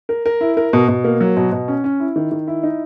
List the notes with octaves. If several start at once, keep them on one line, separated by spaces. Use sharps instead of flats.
A#4
A#4
E4
A#4
B2
B2
A#3
F#3
B2
B2
C#4
C#4
E4
D#3
D#3
E4
D#4